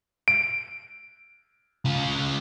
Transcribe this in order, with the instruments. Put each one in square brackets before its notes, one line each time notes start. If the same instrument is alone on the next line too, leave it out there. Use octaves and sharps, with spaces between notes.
[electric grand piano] D7
[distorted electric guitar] C#3 F4